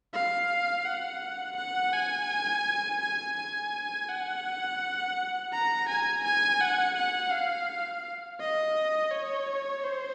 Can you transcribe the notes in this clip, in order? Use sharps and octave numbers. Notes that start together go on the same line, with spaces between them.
F5
F#5
F#5
G#5
G#5
G#5
F#5
A#5
G#5
G#5
F#5
F#5
F5
D#5
C#5
C5